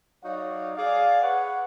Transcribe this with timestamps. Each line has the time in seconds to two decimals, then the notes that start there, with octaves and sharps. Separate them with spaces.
0.24 F#3 D#4 F#4 C#5 D5 F5
0.76 G#4 D5 F5
1.21 G#4 B4 C#5 F#5